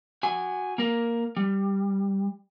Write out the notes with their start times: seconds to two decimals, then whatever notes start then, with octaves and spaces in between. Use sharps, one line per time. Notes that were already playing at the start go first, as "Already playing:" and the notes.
0.23 F#4 G#5
0.78 A#3 A#4
1.36 G3